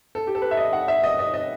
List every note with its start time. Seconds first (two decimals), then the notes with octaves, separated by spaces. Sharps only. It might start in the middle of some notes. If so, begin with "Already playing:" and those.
0.15 A4
0.27 G4
0.35 A4
0.42 B4
0.51 E5
0.57 D#5
0.73 F#5
0.88 E5
1.03 D#5
1.19 D#5
1.34 D#5